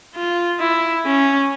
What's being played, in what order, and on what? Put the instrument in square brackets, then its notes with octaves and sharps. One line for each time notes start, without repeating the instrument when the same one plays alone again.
[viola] F4
E4
C#4